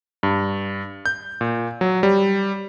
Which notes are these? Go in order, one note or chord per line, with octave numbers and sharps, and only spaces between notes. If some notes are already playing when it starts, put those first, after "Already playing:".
G2
G6
A#2
F#3
G3